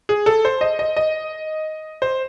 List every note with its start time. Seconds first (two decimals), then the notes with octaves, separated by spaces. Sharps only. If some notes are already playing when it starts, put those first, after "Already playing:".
0.09 G#4
0.26 A4
0.45 C5
0.61 D#5
0.79 D#5
0.96 D#5
2.02 C5